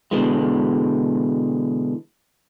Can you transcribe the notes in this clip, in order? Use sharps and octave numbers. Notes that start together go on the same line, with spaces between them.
B2 D3 E3 G#3